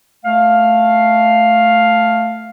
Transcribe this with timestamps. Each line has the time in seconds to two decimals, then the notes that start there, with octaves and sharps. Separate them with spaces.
0.25 A3 F5